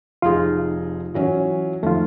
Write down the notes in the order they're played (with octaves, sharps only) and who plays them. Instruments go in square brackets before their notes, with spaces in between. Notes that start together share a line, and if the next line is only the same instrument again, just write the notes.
[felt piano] F1 D#4 G#4 [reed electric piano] F4
[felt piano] E3 F#3 C#4
[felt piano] F2 D#3 [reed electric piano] A3 F4